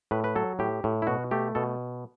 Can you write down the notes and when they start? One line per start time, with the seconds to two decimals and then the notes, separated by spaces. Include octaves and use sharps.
0.11 A2 B4
0.24 B4
0.36 F#3 A4
0.59 A2 G4
0.84 A2
1.02 E4
1.07 B2 F#4
1.31 A3 G4
1.55 B2 A4